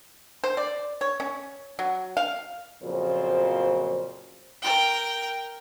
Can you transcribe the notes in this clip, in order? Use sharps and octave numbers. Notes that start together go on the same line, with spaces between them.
C5
D5
C#5
C#4
F#3
F5
F2 A#2 C#3 F3 F#3 C5
A#4 G5